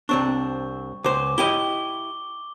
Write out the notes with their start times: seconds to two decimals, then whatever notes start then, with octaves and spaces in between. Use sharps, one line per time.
0.09 C2 C4 D4 C#6
1.04 C#2 C5 D6
1.38 E4 G4 D#5 G7